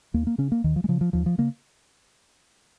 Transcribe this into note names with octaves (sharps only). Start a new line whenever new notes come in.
D#2 A#3
A#3
C#3 C#4
A#3
D#2 D#3
F3
G#3
C#3 F3
F3
D#2 F3
F3
C#3 A#3